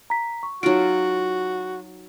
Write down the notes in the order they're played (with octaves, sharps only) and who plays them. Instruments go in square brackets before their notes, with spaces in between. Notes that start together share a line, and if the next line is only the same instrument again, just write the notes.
[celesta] A#5 B6
C#6
[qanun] F#3 F4 [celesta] D#4 D7 [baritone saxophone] F#4